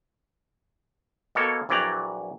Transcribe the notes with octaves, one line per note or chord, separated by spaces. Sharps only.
B2 A#3 A4 C#5
A#1 E3 F#3 D5 G5 A#5